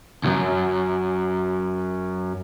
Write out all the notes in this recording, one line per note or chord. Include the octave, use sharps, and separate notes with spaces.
C2 F#2